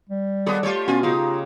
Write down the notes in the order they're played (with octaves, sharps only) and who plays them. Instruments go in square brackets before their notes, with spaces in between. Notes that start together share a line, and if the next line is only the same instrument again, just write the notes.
[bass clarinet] G3
[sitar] D#2 G#3 B3 [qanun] A4 D5 D#5
[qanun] A3 A4 F5 [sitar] F4 G4 C#5
[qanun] B2 [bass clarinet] C#4 [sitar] F4
[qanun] C#3 G4 F5 [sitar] D#4 [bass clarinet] F4